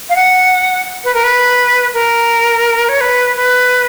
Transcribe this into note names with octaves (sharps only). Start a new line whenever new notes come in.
F5
F#5
B4
A#4
B4
A#4
C#5
B4
B4